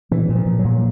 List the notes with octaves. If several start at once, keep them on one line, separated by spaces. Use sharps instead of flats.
A#2 E3
A#2
F3
A#2
F#3
A#2